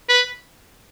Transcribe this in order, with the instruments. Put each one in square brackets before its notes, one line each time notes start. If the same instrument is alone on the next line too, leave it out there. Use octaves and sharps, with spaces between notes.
[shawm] B4